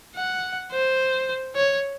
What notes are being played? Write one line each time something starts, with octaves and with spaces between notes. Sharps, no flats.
F#5
C5
C#5